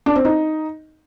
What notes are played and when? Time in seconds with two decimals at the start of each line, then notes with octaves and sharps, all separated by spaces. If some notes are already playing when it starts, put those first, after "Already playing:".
0.06 D4
0.15 C4
0.25 D#4